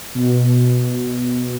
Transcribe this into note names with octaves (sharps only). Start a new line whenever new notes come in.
B2